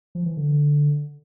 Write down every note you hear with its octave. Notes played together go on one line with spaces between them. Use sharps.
F3
E3
D3